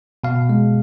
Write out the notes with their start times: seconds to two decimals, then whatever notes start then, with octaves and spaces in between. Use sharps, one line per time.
0.24 B2 F5
0.49 G#3